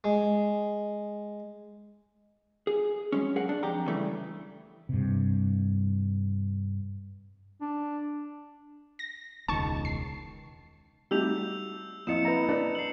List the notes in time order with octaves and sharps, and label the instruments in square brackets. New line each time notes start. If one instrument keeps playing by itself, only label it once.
[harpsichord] G#3
[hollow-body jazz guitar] G#4
F#3 G#3 C#4
G#4 A#4 F#5
D4
F2 G4 A#5
C#3 E3 G3 A3
[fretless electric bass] G2 C3
[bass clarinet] D4
[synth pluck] A#6
[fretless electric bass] E1 C#2 D#3 [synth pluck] A5 C#6
[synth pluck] C7
[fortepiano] G3 A3 F#4 [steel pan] D#4 G4 [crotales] E6 G6 F7
[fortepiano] F2 [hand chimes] A#3 E4 D#5 [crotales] C#7 E7
[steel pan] B4 E5 A#5
[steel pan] D4 [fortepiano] B4
[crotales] C7 F#7